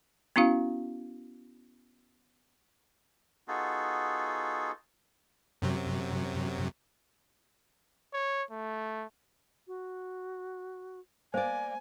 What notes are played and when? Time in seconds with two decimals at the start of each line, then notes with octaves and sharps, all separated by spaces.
0.36 B3 C#4 E4 F#4 F5
3.48 B3 D#4 F4 F#4 G#4 A4
5.62 F#2 C3 F#3
8.13 C#5
8.51 A3
9.67 F#4
11.34 A#3 C5 D5 F5 G#5